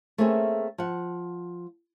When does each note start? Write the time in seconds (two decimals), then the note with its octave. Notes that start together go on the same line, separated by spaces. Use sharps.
0.18 A3 A#3 C4 C#4 G#4 E5
0.78 F3 F#5